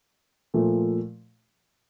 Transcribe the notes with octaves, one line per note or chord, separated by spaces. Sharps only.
A#2 F3 A3